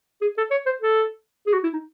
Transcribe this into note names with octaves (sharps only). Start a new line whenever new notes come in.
G#4
A4
C#5
C5
A4
G#4
F#4
E4
D#4